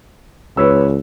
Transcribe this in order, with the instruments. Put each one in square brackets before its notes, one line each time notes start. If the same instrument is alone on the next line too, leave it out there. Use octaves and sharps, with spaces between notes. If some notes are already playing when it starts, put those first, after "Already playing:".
[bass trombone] C#2 [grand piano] B4 C#5 E6